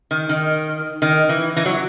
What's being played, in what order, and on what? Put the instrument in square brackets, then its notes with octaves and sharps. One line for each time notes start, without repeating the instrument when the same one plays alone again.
[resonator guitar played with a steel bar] D#3
D#3
D#3
E3
E3
F#3